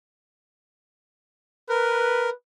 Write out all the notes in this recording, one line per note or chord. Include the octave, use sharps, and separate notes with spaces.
A#4 B4